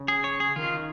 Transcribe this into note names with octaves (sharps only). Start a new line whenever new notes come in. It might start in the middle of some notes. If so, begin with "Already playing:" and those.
Already playing: C#3
G#4
C#5
G#4
D#3 F4